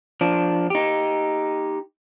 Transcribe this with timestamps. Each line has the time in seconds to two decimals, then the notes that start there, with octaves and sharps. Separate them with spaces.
0.21 F3 D4
0.70 D#4 G4